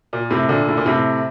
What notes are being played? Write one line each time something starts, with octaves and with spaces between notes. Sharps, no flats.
A#2
A2 C3
A#2 D3
A2
A#2
A2 C3